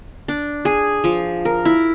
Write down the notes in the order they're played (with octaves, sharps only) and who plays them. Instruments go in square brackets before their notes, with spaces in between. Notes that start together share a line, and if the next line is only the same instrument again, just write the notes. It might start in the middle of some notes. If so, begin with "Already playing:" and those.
[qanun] D4
G#4
F3
A#4
E4